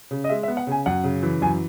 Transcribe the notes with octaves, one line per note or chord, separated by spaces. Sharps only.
C#3
D#5
G#3 E5
E5
B3
F#5
C#3 G#5
F#2 F#5
C#3
E3
F#2 G#5